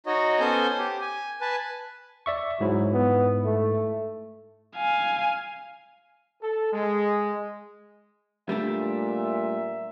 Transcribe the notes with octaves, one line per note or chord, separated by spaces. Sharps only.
D#4 F#4 C#5 D#5
B3 C#4 A4 C5 G#5 G6
G4
G#5
B4 G#5 A5
D5 E5 C#6
G#2 F#3 E4
B3
A3
F5 G#5
A4
G#3
A#2 G3 A3 D4 E5